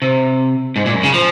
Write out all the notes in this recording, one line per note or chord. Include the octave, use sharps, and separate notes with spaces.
C3
G#2
A#2
F#2
C#3
F3